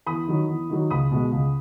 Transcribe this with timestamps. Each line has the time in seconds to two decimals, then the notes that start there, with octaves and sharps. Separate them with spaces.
0.06 E2 B5 D#6
0.27 D#3 F#3
0.48 E2
0.70 D#3 F#3
0.90 C#2 B5 D#6
1.11 B2 G#3
1.32 C#2